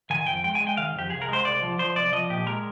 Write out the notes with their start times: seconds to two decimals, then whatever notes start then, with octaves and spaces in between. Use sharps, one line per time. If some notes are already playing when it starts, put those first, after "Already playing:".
0.10 D#3 G#5
0.27 F2 G5
0.44 G#3 G5
0.55 G#5
0.61 G#3
0.67 G5
0.77 D#3 F5
0.95 F2 G4
1.10 C2 G#4
1.22 A#4
1.28 G#3 C5
1.45 C2 D5
1.62 F3
1.79 F3 C5
1.96 C2 D5
2.12 F3 D#5
2.30 A#2 G4
2.46 G#3 A#4